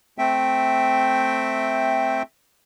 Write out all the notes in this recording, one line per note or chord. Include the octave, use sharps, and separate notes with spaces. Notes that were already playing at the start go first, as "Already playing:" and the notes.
A3 C4 E5 G5